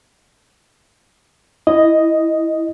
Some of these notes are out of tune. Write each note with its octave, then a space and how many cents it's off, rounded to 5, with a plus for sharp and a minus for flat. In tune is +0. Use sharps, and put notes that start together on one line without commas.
E4 +0 D#5 +0